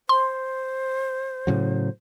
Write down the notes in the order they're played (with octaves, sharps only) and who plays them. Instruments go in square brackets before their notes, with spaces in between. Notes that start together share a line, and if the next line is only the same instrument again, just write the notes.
[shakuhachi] C5 [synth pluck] C6
[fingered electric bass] A2 C#3 F#3